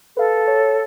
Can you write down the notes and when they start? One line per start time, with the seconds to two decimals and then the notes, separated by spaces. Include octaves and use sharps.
0.17 A4 B4 F5
0.47 C#5